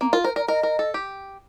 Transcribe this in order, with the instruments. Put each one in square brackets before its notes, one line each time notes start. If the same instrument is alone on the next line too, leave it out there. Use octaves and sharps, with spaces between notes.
[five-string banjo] A#3 [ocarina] C4
[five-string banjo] F4 [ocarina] A#4
[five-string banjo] A#4 [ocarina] C5
[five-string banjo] A#4 [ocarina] D5
[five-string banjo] A#4 [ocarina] D#5
[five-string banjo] A#4
A4
G4